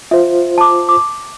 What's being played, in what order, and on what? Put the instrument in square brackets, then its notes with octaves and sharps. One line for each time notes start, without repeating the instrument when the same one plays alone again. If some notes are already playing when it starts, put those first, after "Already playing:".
[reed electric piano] F4 C5 [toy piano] E5
[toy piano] A5 D6
D6